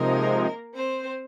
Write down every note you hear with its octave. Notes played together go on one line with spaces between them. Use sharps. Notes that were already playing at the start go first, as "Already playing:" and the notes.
Already playing: C3 F3 G#3 A#3 D#4 A#4
C4 C5